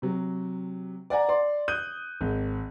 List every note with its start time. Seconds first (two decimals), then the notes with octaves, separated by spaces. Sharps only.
0.02 C3 F#3
1.10 D5 F#5 G#5 A#5
1.29 D5 C6
1.68 D#6 F#6 G6 D#7
2.21 G#1